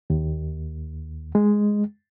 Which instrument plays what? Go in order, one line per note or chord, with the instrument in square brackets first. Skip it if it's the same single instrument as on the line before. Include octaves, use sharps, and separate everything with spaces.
[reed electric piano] D#2
G#3